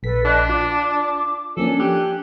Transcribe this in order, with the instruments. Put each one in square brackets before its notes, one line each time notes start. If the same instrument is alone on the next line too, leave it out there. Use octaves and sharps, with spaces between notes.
[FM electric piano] A#1 B6 [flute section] A4 B4
[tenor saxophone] D4 [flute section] D#5 F#6
[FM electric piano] F4 [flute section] D6
[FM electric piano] F3 A#3 C#4 [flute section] D4 G#5 [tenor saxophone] A4
[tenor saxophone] G4 [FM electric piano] F#6